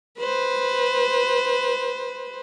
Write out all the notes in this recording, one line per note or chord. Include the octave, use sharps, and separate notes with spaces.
B4 C5